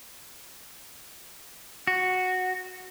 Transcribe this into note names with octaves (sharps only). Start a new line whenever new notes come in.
F#4